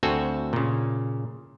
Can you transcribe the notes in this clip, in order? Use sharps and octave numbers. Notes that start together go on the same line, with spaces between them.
D2 C4 F#4 A4 G#5
A#2 C#3